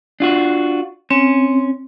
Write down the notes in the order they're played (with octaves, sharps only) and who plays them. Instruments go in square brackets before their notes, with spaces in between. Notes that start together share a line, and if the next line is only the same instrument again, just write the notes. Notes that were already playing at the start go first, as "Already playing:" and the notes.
[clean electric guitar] D4 F4 F#4
[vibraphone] C4 [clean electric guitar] C#4